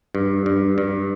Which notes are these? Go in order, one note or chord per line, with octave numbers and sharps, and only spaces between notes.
G2
G2
G2